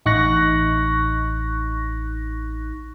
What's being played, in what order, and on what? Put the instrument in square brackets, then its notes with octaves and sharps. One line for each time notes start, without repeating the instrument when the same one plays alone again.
[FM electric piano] A1 D#4 C#6 F#6 A#6